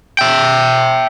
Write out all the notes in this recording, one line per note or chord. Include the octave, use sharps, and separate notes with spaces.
E5 G5